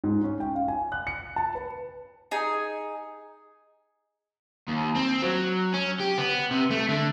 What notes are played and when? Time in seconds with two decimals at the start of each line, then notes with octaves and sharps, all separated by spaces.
0.04 G#2
0.24 C#4
0.40 G5
0.55 F5
0.68 G#5
0.92 F#6
1.07 C#7
1.36 A5
1.55 B4
2.31 D#4 G#4 G#5
4.68 D#2
4.95 C4
5.22 F#3
5.74 C#4
6.00 G4
6.18 B3
6.51 C3
6.71 A3
6.89 D3